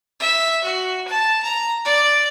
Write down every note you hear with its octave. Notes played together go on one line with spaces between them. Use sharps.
E5
F#4
A5
A#5
D5